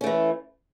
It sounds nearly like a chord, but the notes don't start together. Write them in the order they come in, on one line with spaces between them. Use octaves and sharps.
C#4 A3 E3